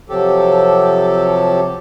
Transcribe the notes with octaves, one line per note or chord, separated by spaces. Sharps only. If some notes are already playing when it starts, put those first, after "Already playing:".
C3 F3 F#3 G4 A4